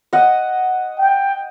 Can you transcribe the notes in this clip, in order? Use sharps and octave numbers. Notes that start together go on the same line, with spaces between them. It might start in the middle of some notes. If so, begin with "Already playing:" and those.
D#5 F#5
G5